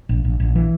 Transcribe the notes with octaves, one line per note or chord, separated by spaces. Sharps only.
A#1
A#1
A#1
E3